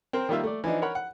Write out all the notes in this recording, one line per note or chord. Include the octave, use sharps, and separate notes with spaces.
C4 A#4 C5
D#3 G3 A#3 F4 E5
A3 D5
E3 F3 D4 D#4
A#4 C#5 F#5 B5
F#5